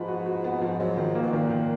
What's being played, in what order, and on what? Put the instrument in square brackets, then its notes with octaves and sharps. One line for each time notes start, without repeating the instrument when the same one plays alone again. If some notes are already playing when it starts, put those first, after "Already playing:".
Already playing: [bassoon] G#2 [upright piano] F3 B4
[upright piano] F#4
F#4
B3
F3
[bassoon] G#2 [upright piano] F#3
[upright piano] D#3
A#3
[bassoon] B2
[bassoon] A#2 [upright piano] D#3
[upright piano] D#3